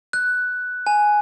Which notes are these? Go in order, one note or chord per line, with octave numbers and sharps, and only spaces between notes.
F#6
G#5